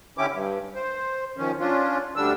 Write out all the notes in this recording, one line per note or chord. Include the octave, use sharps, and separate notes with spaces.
D3 C#4 E4 G4 D6
G2
C5
D#3 F3 C#4
C#4 D4 F4
D2 D3 G3 D4 E6